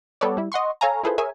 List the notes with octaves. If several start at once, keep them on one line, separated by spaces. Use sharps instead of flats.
G3 B3 A4 B4 C#5 D5
G3 E4
D#5 F#5 C6 C#6
A4 C#5 F5 G#5 A#5
E4 F4 G#4 A4 B4 C5
G#4 A#4 C#5 E5 G#5